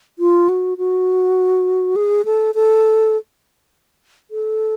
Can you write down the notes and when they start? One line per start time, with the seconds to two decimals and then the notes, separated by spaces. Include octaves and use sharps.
0.19 F4
0.49 F#4
0.78 F#4
1.96 G#4
2.25 A4
2.55 A4
4.31 A4